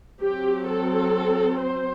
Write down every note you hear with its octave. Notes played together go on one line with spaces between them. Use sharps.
F#3 C4 G4
A4
C5